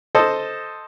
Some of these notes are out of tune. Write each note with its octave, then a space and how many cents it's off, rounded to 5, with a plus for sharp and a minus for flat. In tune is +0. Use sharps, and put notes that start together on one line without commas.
A4 +0 C5 +0 D#5 +0